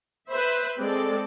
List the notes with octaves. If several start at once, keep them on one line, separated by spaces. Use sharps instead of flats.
B4 C5 E5 B5
G#3 C4 A4 D5